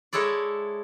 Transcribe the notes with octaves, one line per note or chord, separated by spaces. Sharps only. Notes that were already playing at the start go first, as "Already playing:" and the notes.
G#3 E4 A4 C#5 D5